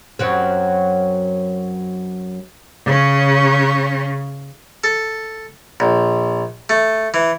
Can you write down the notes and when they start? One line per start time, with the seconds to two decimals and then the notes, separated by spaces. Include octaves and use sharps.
0.19 F#2 F#3 C4
2.86 C#3 C#4
4.84 A4
5.80 A#1
6.69 A3
7.14 E3